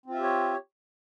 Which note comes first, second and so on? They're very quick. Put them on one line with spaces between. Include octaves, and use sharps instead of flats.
C4 F4 E5 G4 C#5